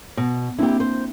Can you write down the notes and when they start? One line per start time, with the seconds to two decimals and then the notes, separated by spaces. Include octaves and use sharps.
0.17 B2
0.59 A#3 C4 D4 E4 G4
0.80 C5